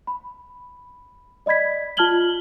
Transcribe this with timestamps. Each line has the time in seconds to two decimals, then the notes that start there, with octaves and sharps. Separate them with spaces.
0.07 B5
1.46 D5 D#5 B5 G#6 B6
1.97 F4 A5 F6 G#6 F#7 G7